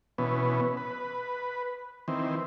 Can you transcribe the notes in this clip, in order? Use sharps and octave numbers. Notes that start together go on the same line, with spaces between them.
B2 E3 B3 C#4
B4
D#3 E3 C4